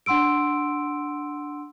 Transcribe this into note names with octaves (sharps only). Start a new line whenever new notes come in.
D4 F#5 C6 E6 D7